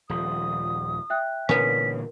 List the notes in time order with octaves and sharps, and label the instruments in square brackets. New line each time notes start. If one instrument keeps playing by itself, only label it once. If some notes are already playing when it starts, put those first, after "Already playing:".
[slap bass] D#1 F3 [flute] D#6
[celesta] E5 G5 F#6
[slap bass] A#2 D3 E3 [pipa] B3 C#4 [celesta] A#4 [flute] B6